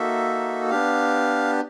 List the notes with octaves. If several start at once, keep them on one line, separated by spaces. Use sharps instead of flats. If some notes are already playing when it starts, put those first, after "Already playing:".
Already playing: A#3 D#4 F#4 A4 E5
B3 D4 G4 F5